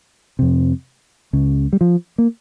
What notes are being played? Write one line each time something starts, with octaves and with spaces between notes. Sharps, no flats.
F2 C3
C#2 C#3
G3
F3
A#3